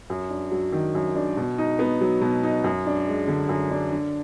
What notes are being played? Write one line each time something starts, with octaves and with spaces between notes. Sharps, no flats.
F#2
D4
F#3
D#3
F#2
D4
B2
D#4
B3
F#3
B2
D#4
F#2
D4
G#3
D3
F#2
D4
D3